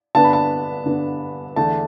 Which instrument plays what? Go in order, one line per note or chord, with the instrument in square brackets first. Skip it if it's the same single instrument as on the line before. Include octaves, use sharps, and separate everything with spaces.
[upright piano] G2 D3 B3 D4 A5
B5
A5
G2 D3 B3 D4
E2 D3 A3 D4 A5